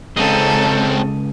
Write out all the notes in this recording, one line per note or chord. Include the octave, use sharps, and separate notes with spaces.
C#2 C#3 C4 D#4 G#4 A4